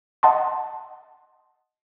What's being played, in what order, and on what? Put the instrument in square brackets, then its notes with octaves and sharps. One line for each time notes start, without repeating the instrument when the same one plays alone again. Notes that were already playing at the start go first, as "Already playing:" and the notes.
[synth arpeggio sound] D#5 F#5 A5 C6